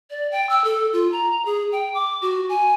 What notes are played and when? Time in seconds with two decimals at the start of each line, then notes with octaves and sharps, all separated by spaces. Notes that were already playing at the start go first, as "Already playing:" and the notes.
0.10 D5
0.31 G5
0.49 E6
0.64 A4
0.93 F4
1.12 A#5
1.46 G#4
1.72 G5
1.94 D6
2.22 F#4
2.49 G#5